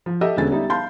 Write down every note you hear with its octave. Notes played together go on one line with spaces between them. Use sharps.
F3
G4 A4 D#5 E5 E6
E1 D3 G#3 C#4 G#4 A6
G3 D#4 E5
F5 A5 B5 C6 F6 G6